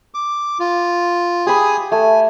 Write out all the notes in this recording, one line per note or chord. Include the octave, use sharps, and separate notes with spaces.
D6
F4
G4 G#4 G#5 B5 D#6
A3 G#5